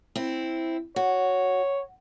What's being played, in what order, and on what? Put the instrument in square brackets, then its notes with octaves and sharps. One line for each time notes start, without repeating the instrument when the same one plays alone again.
[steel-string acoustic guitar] C4 E4
[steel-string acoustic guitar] F#4 [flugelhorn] C#5